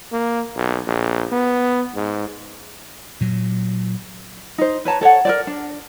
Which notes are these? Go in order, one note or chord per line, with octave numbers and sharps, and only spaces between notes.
A#3
B1
A#1
B3
G#2
A#2 F#3
D#4 C5
B4 C#5 A5 A#5
A4 C#5 D5 F#5
A#4 C5 D5
D4